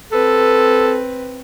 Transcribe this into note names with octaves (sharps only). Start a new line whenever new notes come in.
C4 A4 B4